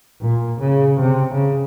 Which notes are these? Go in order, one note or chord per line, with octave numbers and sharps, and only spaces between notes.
A#2
C#3
C3
C#3